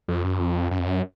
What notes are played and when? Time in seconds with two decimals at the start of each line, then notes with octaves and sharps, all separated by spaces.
0.08 F2
0.24 F#2
0.40 F2
0.71 F#2
0.79 F2
0.86 F#2